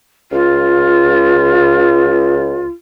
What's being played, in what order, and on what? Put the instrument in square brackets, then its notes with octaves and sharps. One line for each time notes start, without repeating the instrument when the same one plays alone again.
[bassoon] C#2 [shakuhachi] F4